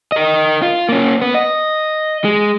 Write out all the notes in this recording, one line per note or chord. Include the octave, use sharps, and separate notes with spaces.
A#4 D#5
F4
A#3 C#4
B3
D#5
G#3